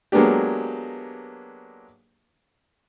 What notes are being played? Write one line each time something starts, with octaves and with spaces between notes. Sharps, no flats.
F#3 G#3 A#3 B3 D4 G4